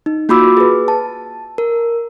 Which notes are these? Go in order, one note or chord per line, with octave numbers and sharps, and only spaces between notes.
D#4
A#3 F4 F#4 B5 D6 E6
G#4 B4
A5
A#4